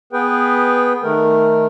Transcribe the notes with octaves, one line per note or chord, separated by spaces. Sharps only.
B3 G#4 B4 G5
D#3 A3 A#4